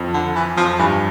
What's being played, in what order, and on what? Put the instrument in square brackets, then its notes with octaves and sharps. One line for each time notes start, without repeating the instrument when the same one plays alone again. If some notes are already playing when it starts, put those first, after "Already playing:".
Already playing: [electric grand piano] F2
[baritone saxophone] D3
E3
[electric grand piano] F2 [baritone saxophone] F3
[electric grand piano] G2 [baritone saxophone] E3